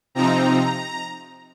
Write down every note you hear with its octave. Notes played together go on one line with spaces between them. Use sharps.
C3 F3 C4 D#4 A#5